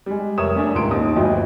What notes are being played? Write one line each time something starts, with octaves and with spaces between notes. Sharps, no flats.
G3 G#3
F1 A#4 C#5 E5 D#6 E7
A3 C#4 D4 A#4
D#1 C#2 G#2 C6 D7
D#2 D#4 D#6
G1 D2 F3 D#5 G5